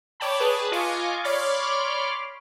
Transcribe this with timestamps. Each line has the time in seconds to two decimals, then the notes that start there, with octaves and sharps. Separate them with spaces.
0.20 C#5 D5 G5 A5 B5
0.39 G#4 B4 A5 B5
0.72 F4 D#5 G#5 C#6 D6
1.24 C#5 D5 B5 C6 D6 F6